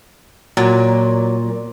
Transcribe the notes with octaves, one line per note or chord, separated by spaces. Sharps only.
A#2 F#3